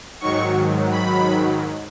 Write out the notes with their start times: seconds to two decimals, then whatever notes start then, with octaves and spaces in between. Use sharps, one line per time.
0.21 G#2 D#3 F#3 C#6
0.91 B5